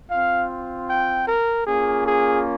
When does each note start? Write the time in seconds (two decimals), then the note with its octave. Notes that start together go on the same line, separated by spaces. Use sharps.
0.11 C4 F4 F5
0.89 G5
1.28 A#4
1.67 A#3 C#4 F4 G#4
2.06 G#4